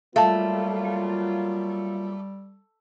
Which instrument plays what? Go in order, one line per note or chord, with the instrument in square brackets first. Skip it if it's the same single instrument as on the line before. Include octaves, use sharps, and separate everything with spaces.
[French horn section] F#3 A#3 F4 [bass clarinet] G3 [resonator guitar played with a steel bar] A3 [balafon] F5 A5